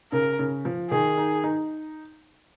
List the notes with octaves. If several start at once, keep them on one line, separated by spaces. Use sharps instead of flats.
C#3 A#4
C#3
F3
D#3 G#4
D#4
D#4